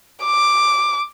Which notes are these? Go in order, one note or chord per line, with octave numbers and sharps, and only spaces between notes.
D6